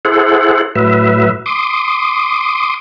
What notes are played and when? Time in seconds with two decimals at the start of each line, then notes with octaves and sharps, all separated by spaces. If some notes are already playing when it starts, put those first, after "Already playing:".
0.05 E4 G#4 A4 C5 F#5
0.75 A2 F#3 B4 E5
1.46 C6 D6 D#6